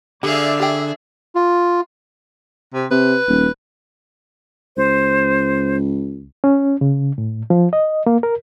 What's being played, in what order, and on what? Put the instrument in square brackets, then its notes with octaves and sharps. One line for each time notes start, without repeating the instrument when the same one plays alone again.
[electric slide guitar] D3 [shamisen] G4 [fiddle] G#4 F5 [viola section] D5 E5
[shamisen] G4 G5 [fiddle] G#4
[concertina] F4
[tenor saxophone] C3
[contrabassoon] C3 [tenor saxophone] B4
[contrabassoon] D#1
[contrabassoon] C#2 [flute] C5
[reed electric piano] C#4
C#3
A2
F3
D#5
A#3
A#4